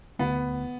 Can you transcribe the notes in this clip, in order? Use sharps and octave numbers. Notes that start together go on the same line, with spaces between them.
D2 D3 A3 B3